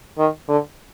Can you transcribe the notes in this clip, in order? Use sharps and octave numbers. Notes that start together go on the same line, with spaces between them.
D#3
D3